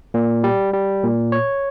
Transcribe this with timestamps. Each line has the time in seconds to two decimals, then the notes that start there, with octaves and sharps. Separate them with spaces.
0.14 A#2
0.44 G3
0.73 G3
1.03 A#2
1.32 C#5